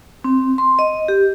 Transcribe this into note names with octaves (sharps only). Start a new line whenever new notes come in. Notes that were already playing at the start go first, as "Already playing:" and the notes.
C4
C6
D#5
G4